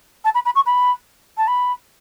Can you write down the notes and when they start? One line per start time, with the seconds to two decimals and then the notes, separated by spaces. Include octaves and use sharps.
0.24 A5
0.34 B5
0.45 B5
0.55 C#6
0.66 B5
1.37 A5
1.47 B5